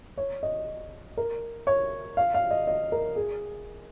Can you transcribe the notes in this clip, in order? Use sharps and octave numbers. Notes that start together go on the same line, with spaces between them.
C#5
D#5
A#4
C#5
F5
F5
D#5
D#5
A#4
G#4